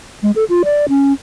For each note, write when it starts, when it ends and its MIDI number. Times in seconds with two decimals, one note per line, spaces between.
0.23 0.31 56
0.36 0.44 69
0.50 0.63 65
0.65 0.86 74
0.89 1.13 61